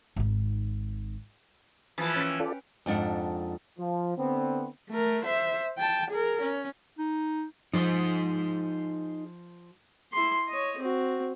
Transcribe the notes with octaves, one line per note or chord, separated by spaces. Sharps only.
G#1 D#4
E3 F3 A#3 G#4 B5 A6
C#4 B4 G5
F4 A4 D5
F2 G#2 D4 F4 F#5
F3
D3 B3 C4
A3 A#4
C5 E5
G5 A5
G#4 A#4
C#4
D#4
F3 D#4 G#4 C5
E4 C6
C#5 D#5
C4 F#4